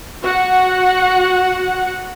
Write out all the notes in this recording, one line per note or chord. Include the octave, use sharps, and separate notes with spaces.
F#4 F#5